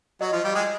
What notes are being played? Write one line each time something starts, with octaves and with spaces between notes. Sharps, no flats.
F#3 F#4 D#5
F3 F4
G3 G4
G#3 G#4